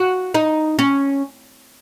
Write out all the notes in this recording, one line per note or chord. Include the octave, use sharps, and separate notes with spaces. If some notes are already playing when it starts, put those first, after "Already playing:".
Already playing: F#4
D#4
C#4